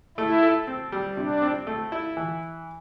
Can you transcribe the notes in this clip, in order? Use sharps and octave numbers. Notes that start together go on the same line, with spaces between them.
A3 E4
A4
C4
G3
C3 D4
C4
A3
E4
E3